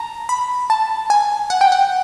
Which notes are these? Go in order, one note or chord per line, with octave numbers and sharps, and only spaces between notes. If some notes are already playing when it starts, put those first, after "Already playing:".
Already playing: A5 A#5
B5
A5
G#5
F#5
G5
F#5